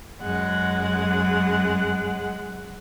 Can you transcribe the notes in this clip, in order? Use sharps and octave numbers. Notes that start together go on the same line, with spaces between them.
F#2 G#3 F#5